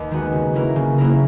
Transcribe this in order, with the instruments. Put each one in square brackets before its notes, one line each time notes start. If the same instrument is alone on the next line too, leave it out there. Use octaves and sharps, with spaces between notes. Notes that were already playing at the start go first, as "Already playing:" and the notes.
Already playing: [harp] D#2
D#3 G#3 B3 F#4
C#3
F#3 A#3 E4 A#4
C#3
F#3 A#3 E4 A#4